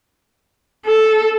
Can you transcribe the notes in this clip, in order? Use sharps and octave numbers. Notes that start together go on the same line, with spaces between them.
A4